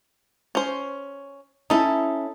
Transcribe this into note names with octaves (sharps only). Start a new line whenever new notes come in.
C#4 C5
C#4 D#4 E4 A4